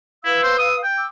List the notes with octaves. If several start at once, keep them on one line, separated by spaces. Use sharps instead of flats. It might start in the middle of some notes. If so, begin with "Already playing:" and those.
E4 B4 F5 E6
C5
D#6
G5
D6 E6